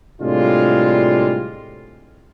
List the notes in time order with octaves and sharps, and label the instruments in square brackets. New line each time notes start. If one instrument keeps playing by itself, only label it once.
[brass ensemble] A2 C3 G3 G#3 D4 F4